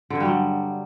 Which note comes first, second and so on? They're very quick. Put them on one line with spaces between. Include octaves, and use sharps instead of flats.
D3 G2 G3 F#3